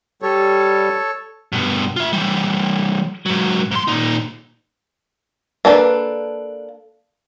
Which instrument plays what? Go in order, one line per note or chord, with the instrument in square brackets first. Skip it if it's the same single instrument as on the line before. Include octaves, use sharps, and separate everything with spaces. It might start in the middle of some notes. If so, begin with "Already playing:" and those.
[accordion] G3 [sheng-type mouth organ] A4 C#5
[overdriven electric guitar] G2 B2
F4 E5
E3 G3
G#2 F#3
G#2 C6
A#2 D#4
[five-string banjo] A#3 D4 A4 B4